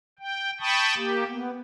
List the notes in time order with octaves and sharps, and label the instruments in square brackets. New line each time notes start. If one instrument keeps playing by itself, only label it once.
[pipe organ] G5
G5 A5 B5 C#6 D#6
A#3 G4
B3